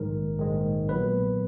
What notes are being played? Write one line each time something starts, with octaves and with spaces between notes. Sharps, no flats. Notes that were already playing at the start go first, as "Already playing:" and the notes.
Already playing: A#1 G#2 D#3 G#3 A#4
A#1 G#2 D#3 G#3
B1 A#2 F#3 B3 B4